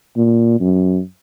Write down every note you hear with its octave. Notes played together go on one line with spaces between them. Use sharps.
A#2
F#2